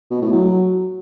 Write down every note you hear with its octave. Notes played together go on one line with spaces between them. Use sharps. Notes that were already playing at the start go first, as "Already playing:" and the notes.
B2
A2
F#3